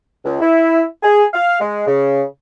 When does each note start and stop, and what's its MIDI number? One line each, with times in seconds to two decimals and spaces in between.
0.24 0.37 37
0.40 0.84 64
1.03 1.24 68
1.33 1.58 77
1.60 1.83 56
1.87 2.22 49